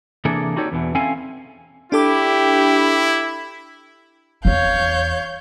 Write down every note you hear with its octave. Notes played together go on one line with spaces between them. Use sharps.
C3 E3 A#3 D4 G#4 A4
D#4 F#4 G4 A4 C#5 D5
E2 B2 E3
C4 C#4 E4 A4 F5 G#5
D4 E4 G4 A4 D6
E2 D4 C#5 F5 G6